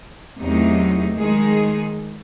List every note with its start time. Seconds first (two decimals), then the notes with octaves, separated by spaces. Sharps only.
0.37 E2 C3 F#3 A3 D#4
1.14 D#3 G#3 D#4 G#4